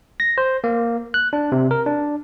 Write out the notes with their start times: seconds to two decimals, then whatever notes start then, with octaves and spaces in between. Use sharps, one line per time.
0.20 A#6
0.38 C5
0.64 A#3
1.14 F#6
1.33 D4
1.52 C3
1.71 A#4
1.86 D4